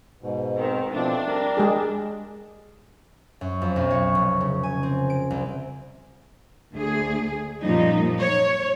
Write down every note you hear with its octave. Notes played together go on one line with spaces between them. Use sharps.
G#2 B2
D#3 C4
B2 F3 A3 C4 D4
G3 A#4
G#3 G4 G#4
F#2
F2
B1
C#5
F1
C#3
G#5
C4
D7
C2
D2 G#4
F#2 A#2 F3 G3 D#4
C#5